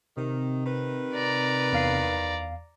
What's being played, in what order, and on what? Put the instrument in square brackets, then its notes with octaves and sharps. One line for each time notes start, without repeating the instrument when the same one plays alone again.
[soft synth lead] C3 [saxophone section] D#3
[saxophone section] D#3 B4
[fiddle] D5 A#5
[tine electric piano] E2 F5 C7